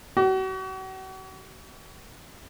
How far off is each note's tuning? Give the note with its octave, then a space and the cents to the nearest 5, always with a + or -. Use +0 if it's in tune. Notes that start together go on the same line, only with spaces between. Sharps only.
F#4 +40